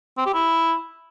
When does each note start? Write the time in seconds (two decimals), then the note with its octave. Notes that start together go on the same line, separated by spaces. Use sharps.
0.18 C4
0.26 G4
0.34 E4